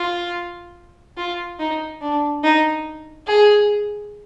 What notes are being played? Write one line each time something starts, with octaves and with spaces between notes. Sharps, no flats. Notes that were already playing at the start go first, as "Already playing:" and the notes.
Already playing: F4
F4
D#4
D4
D#4
G#4